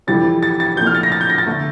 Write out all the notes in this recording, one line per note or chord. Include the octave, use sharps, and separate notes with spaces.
F2 C3 E3 G3 A6
A6
A6
C2 A#2 F3 A3 G6
F6
A6
A#6
A6
G6
A#6
A6
D3 A3